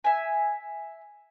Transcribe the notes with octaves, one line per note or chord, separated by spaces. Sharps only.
E5 G#5